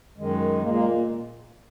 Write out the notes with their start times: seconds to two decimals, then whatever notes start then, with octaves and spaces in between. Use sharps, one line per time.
0.17 F#2 D#3 G#3
0.62 A#2 G#3 A#3
0.74 A#3